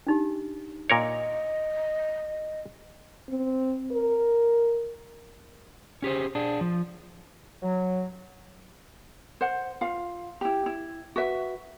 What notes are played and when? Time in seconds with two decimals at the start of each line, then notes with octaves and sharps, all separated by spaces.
0.07 D4 D#4 G4
0.90 A#2 A#4 C#5 D#5
3.29 C4
3.92 A#4
6.02 C#4 G4 G#4 C5
6.35 D4 G#4
6.61 F3
7.63 F#3
9.41 C5 F#5
9.81 F4 F5
10.41 E4 G4
10.66 E4
11.16 F#4 B4 E5